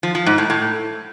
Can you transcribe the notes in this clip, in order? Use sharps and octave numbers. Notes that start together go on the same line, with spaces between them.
F3
F3
G#2
A2
A2